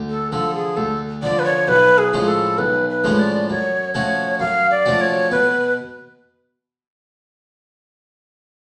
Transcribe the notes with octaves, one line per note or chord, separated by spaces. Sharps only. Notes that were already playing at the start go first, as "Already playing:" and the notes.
Already playing: D2
A4
D3 F3 A4
G#4
D2 A4
D3 F3 D5
B4
C#5
B1 B4
G#4
A2 F3 G#3 C#4
A4
B1 B4
B4
A2 F3 G#3 C#4
D5
F#2 C#5
F3 A3 C#4 F#4 C#5
F#2 F5
D5
F3 A3 C#4 F#4
C#5
B2 B4